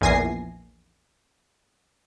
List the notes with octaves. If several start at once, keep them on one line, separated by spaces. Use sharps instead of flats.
A#1 E2 G#5 A#6 C7